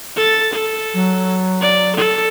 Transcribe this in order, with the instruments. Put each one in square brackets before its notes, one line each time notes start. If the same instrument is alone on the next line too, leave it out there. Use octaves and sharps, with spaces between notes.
[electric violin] A4 A6
A4
[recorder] F#3
[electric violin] D5
A4